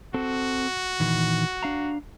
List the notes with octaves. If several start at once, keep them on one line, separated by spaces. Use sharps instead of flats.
C4 F#4 A4
A#2 D#3 E3
D4 F5 A#5